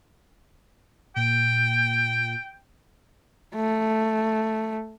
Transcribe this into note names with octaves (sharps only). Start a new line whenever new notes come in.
A#2 G5
A3